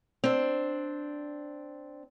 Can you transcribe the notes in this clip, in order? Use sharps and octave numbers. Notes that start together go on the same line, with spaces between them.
C4 D4